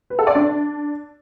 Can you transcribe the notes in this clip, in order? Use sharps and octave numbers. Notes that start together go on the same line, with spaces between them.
B4
A4
D5
D4